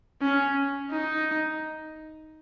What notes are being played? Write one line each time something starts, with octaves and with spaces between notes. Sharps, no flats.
C#4
D#4